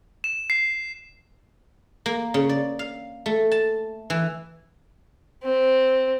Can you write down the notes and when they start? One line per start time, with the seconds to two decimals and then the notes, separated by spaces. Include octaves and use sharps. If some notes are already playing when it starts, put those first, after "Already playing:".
0.24 E7
0.50 C7
2.06 A#3
2.34 C#3
2.49 D5
2.79 F5
3.26 A3
3.52 A5
4.10 E3
5.44 C4